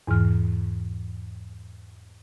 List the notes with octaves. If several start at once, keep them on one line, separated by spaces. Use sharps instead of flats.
E2 G#2 E3 F6